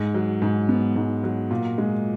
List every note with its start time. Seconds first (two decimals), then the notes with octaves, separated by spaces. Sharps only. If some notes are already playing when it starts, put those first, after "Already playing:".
Already playing: G#2
0.14 F#3
0.42 G#2
0.69 B3
0.96 G#2
1.24 F#3
1.51 A#2
1.78 G#3